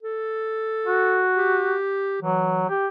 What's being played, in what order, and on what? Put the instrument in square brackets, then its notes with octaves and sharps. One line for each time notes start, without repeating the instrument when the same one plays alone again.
[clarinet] A4
[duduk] F#4
[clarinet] G4
[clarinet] E3 [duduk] F#3
[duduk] G4